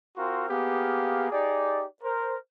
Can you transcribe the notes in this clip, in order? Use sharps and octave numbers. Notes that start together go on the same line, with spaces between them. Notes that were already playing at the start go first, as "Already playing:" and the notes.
C4 F4 F#4 A#4 C6
A#3 B3 G4 G#4 F5
D#4 G4 G#4 D5
A#4 C5